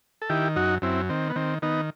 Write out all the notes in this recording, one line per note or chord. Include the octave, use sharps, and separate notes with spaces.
A4
D#3 E4 G4
F#2 D#4 F#4
F#2 C4 E4
D#3 C4
B3
D#3 C4
D#3 B3 D#4